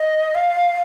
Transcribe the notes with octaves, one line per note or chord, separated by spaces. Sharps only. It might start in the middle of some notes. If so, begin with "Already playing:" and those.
Already playing: D#5
F5